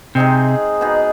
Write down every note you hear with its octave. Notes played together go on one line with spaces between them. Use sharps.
C3 G#3 C4 D#4 G#4
B2 B3 D#4 G#4